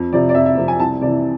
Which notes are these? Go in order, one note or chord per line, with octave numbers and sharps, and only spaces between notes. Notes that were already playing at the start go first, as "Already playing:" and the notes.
Already playing: F2
C3 F3 D5
D5
F2 E5
E5
C3 F3
G#5
C2 A5
C3 E3 D5